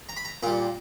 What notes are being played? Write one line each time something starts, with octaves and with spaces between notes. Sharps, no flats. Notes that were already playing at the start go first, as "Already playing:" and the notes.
A#5
B5
A#5
A#2 G3 A#5